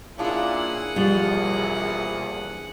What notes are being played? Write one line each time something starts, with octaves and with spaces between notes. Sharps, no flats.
A#2 C#4 D4 E4 F4 G#4 F#5
A#1 E2 B2 F3 G3 F4